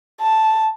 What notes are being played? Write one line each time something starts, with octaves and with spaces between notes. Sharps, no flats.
A5